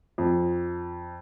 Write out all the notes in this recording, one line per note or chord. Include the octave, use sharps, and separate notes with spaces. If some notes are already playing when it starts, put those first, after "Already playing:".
F2